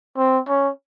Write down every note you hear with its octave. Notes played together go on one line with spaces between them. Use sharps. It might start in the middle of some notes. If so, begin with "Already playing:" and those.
C4
C#4